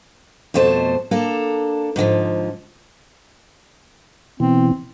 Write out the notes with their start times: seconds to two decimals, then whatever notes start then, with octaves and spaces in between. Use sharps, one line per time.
0.54 F2 B2 A3 C5 A5
1.11 A#3 D4 A4
1.96 G#2 D3 E3 F3
4.40 B2 E3 C4